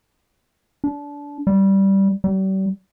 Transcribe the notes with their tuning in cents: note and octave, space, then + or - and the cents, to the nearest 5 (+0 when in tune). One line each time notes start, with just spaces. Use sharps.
D4 -25
G3 -10
G3 -40